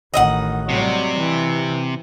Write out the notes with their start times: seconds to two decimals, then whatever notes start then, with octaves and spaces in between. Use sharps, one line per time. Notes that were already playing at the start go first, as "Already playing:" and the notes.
0.14 A1 D#3 D#5 E5 F#5
0.69 C3 F#3 G3
1.18 E3